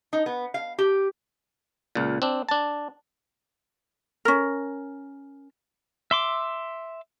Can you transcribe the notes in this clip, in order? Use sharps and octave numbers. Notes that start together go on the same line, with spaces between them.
D#4
B3
F5
G4
C#2 A#2
C4 D4
D4 A5
C#4 A#4
E5 C6 D6